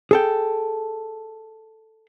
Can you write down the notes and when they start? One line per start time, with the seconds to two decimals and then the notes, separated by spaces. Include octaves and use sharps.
0.11 G#4 A4 G5